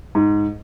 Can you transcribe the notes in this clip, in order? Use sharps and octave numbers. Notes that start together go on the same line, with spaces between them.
G#2